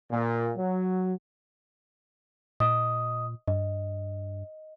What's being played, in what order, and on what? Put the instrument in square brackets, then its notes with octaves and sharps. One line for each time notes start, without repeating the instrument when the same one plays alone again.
[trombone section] A#2
F#3
[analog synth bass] A#2 [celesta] D#5 D#6
[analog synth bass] G2 [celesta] D#5